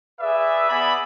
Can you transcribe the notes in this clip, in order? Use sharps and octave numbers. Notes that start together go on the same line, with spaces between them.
G#4 B4 D5 E5
B3 G#4 D5 E5 B5